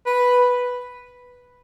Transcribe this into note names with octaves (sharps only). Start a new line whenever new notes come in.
B4